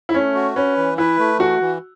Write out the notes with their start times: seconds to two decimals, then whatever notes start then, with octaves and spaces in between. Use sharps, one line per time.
0.09 E4
0.14 A3 C#4
0.35 F#4
0.56 C#4 B4
0.77 E3
0.98 E4 B4
1.19 A3
1.40 E3 F#4
1.61 E3